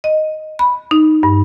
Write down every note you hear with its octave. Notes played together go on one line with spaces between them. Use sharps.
D#5
B5
D#4
G2